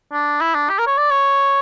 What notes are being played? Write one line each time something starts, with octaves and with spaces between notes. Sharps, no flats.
D4
E4
D4
G4
A#4
C#5
D5
C#5